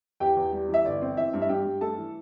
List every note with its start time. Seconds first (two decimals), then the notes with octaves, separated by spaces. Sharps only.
0.20 E2 G4 G5
0.37 E2
0.53 G3
0.69 E3
0.74 E5
0.85 G1 D5
1.02 C4
1.17 E3 E5
1.34 G2
1.41 E5
1.49 G2 G4 G5
1.65 G2
1.81 A3 A4 A5
1.98 E3